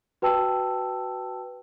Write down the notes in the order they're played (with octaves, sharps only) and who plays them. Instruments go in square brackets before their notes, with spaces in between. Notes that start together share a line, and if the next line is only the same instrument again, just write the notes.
[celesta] F#4 B4 G5 A5 E6